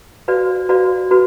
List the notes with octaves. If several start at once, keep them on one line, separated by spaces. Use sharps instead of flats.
F#4 B4 D5 F5
F#4 B4 D5 F5
F#4 B4